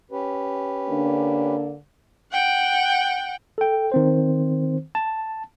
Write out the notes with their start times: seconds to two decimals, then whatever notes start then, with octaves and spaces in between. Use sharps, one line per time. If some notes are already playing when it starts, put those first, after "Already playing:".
0.11 C#4 G4 B4
0.89 D3 A#3 D4
2.32 F#5 G5
3.58 A4 G5
3.92 D#3 C4 C5
4.95 A5